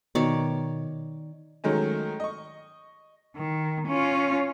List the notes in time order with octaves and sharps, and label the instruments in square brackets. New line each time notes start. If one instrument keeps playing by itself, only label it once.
[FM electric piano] B2 [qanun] D#3 C#5 D5
[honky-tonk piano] D#3 F#3 G#3 A3 C#4
D#5 C#6
[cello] D#3
C#4 F4